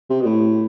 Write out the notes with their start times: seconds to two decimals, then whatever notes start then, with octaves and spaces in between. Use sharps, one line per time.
0.10 C3
0.21 B2
0.26 A2